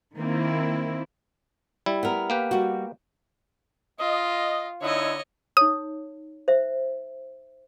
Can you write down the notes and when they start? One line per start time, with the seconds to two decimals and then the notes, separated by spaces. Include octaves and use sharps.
0.16 D#3 A#3 C4 E4
1.86 G3 E4
2.03 B3 A#4
2.30 A#3 G4 B4
2.51 G3 F#4
3.99 F4 D#5
4.81 D3 D#4 E4 C#5 D#5
5.57 D#4 C#5 D#6
6.48 C5 E5